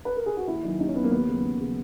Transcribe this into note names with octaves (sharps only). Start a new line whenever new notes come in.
B4
A#4
G#4
F#4
D#2 E4
D#3 F#3
D#2 D#4
C#4
D#3 F#3 A#3 B3
D#2 B3
C#3 F#3
D#2
C#3 F#3